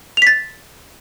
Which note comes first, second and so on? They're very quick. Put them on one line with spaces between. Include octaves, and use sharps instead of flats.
F7 B6 A6